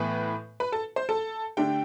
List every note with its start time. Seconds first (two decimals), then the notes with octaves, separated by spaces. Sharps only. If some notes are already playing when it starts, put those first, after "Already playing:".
Already playing: A2 E3 B3 B4 B5
0.60 B4 B5
0.72 A4 A5
0.96 C5 C6
1.09 A4 A5
1.57 D3 A3 D4 G4 G5